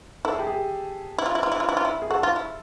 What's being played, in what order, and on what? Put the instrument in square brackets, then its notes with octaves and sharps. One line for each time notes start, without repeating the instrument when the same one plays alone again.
[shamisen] E4 [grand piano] A4
[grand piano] G#4
G4
G#4
[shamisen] E4
F4
E4
F4
E4
F4
E4
F4
E4
[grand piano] G#4
[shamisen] F#4 [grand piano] A4
[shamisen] F4
E4